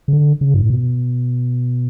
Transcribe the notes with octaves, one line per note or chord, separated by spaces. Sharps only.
C#3
D3
C#3
G2
A2
B2